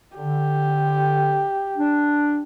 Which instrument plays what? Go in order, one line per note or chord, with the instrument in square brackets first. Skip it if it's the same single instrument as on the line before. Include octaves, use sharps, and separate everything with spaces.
[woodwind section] D3 [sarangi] G4
[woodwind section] D4